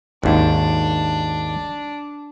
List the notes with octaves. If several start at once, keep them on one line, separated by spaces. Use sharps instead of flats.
G#1 D#2 D4